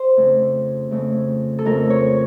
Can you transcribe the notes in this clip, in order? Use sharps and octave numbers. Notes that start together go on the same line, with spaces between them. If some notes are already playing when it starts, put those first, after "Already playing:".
Already playing: C5
F2 C#3 A3
F2 C#3 A3
A4
F2 C#3 A3 A#4
C#5